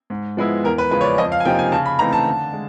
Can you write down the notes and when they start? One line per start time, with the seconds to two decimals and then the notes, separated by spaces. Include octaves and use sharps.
0.10 G#2
0.37 F3 G#3 B3 E4
0.64 E2 A#4
0.78 B4
0.91 C#3 F3 G#3 B4
1.01 C#5
1.04 D5
1.18 F2 D#5
1.32 F5
1.40 G#5
1.45 C3 F3 A#3 D#4 G5
1.59 G#5
1.72 C#3 A5
1.86 B5
1.99 E3 A3 C4 D#4 A#5
2.13 A5
2.26 D3
2.53 G#3